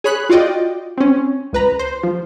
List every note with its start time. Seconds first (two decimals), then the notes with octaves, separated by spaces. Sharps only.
0.04 G#4 C#5 B5 F#6
0.29 F4 F#4 D5 D#5 G5
0.97 C4 C#4
1.53 C#2 B4 A#5
1.79 C5
2.03 F3